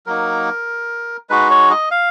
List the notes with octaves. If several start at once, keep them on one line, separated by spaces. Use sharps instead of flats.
F#3 A#3 D#4 A#4
G#3 D#4 F#4 B4
C#5
D#5
F5